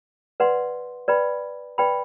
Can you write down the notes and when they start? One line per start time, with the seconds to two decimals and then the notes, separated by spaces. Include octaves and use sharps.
0.40 B4 D5 F#5 C6
1.08 B4 D5 G5 B5
1.78 B4 D5 G5 B5